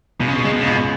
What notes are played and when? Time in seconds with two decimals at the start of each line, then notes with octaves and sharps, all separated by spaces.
0.20 C#2 B2
0.28 C#3
0.36 B2
0.44 C#3 G#3
0.52 B2
0.61 C#3
0.67 C#2 B2